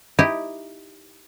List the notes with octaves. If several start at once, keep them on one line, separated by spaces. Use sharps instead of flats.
D#4 E4 G4 D#5